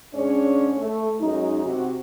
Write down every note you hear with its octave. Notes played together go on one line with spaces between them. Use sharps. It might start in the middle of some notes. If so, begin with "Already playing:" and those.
G#2 G#3 C#4 D4 C#5
A3
F#2 G#3 D#4
C3 F#4